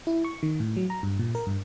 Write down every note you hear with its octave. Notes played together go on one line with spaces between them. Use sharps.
E4
C#6
D#3
A2
F#3
A#5
G2
A#2
A#4
G2